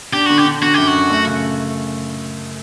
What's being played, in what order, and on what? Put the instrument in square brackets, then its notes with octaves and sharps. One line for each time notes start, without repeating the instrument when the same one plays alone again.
[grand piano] D4 [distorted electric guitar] G4
[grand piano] D3 [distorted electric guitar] F#4
[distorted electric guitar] G4
[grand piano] D3
[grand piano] D3 [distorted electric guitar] F#4
[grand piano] F#2 [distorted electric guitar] G4
[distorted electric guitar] F#4
[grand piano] F#2
A3
C#3